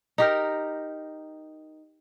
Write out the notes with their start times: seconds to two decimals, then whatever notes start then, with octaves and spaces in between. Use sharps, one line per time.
0.18 D#4 G4 A#4